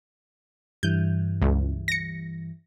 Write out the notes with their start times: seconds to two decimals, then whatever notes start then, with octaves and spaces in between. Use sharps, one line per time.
0.83 G2 E3 G6
1.42 C#2
1.88 A#6 C#7